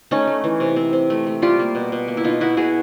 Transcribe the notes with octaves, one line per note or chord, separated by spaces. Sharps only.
A3 C#4 D#4
A3
E3
C3
C4
C4
A3
A3
G3 F4 G4
A#3
B2
B2
A#3
E4
B2 D#4 F4
B2 E4 F#4
B2 F#4 G#4